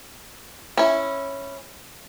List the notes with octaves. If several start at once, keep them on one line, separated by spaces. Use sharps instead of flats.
C#4 E4